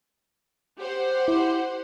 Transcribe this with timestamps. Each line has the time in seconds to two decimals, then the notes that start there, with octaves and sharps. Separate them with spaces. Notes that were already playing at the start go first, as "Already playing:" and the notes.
0.79 G4 C5 F#5
1.28 E4